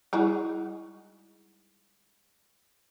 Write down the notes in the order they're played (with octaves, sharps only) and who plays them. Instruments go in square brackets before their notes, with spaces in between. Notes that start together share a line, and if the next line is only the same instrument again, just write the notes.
[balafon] G3 E4 G#4 [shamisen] G#3 D#4 F#4